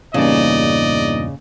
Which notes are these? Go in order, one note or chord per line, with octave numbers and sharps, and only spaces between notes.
E2 G2 A#2 C#3 A#3 D#4 D5 D#5